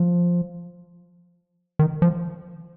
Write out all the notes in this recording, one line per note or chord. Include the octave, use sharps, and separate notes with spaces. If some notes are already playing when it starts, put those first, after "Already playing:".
Already playing: F3
D#3
F3